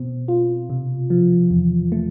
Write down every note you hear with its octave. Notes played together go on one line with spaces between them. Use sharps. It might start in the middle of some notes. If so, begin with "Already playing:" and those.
Already playing: B2 C4
F4
C3
F3
E2
A3